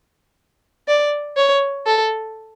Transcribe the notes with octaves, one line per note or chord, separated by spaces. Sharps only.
D5
C#5
A4